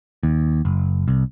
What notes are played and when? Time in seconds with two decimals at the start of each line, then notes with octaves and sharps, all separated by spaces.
0.23 D#2
0.65 F#1
1.08 C2